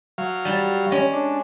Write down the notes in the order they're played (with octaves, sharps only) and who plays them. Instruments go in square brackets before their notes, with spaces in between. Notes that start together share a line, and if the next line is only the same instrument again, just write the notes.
[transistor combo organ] F#3 F5
[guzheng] G3 A5
G#3 C#4
[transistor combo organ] D4